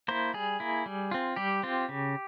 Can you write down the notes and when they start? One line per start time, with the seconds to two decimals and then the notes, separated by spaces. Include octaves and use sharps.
0.08 A#3 E4 C5
0.34 G3 G#4
0.60 A#3 E4
0.86 G3
1.11 C4 F4
1.36 G3 G4
1.63 C4 F4
1.89 C#3